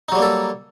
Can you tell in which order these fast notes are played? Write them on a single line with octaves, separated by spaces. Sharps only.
D#4 F#3 G3 A#3 A4